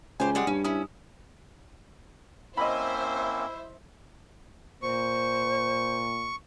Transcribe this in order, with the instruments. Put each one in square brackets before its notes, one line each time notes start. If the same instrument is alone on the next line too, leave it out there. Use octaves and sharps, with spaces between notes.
[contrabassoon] C#2 [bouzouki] G4 C5 [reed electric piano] G#5
[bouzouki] G3 G#3 F#5
[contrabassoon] G2 [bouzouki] C#4
[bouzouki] C#4 E4 [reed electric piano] D#6
[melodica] A#3 C4 C#4 [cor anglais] E4 [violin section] C5 E5 [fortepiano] D#5 B5
[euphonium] A#2 [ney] C5 [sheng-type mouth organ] C#6